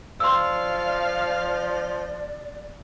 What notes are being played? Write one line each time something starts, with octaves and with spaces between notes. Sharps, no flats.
F3 D5 F5 C6 E6